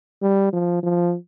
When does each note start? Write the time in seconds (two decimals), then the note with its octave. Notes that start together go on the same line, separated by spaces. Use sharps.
0.22 G3
0.53 F3
0.83 F3